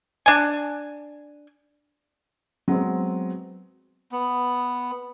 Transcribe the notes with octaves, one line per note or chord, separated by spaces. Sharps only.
D4 G#5
F#3 G#3 B3 C4
B3